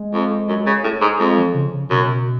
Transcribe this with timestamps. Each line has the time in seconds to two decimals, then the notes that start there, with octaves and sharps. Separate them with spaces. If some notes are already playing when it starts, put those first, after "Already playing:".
Already playing: G#3
0.14 F2
0.49 F#2
0.67 C#3
0.84 A2
1.01 G#2
1.20 F2 G#3
1.37 F3
1.54 C#3
1.73 C#3
1.90 F#2 B2